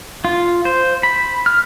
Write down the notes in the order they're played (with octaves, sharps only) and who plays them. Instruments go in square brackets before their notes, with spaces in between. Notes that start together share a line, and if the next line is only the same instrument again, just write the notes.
[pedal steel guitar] F4
C5
B5
F6